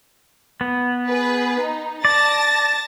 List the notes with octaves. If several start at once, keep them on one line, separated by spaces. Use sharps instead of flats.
B3
G#4 B4
D#4
D5 A5 A6 A#6